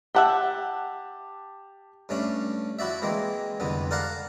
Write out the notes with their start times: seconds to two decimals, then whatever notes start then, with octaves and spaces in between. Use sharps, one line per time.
0.15 G4 E5 F#5 G5 A5
2.09 G2 A3 C#4 D4
2.79 F3 E4 F#4 D5 E5
3.02 E3 G#3 A#3 C4
3.60 C2 F2 D3 B3
3.91 A4 A#4 D5 F5 F#5 A#5